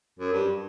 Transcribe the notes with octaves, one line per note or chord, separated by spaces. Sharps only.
F#2
G2